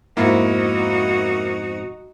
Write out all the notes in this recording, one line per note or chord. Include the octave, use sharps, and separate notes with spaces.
F2 G#2 B2 A#3 D#4 E4 F#4